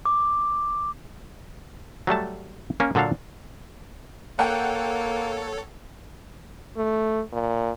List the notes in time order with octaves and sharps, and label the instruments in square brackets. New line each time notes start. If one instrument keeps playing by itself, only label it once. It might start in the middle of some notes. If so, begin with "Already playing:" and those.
[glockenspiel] D6
[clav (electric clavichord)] F#3 G3 A3 A5
A#3 C#4
A#2 D3 F#3 A4 F5
[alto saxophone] A#3 [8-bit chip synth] A4 C#5 [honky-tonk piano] F#5 G5
[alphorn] A3
A#2